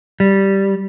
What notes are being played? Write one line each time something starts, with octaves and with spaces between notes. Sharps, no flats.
G3